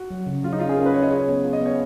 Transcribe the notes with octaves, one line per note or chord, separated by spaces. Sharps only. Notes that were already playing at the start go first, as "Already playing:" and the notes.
Already playing: F#4
F#3
C#3
F#3 F4
D#4
C#4 F4
G#4
C#4 A#4
B4
C#4 C#5
D#5
G#4 C#5
B3
F4
D#5
B3 C#5